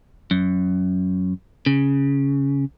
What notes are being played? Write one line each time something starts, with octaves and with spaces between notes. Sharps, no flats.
F#2
C#3